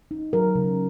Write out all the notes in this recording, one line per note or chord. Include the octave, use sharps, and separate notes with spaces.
D#4
F#3 A#4
C#3